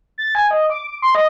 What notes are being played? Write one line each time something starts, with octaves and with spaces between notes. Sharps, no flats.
A6
G#5
D#5
D6
D6
C6
D#5